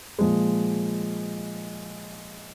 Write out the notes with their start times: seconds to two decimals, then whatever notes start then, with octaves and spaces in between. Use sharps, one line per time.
0.19 A#2 F3 G#3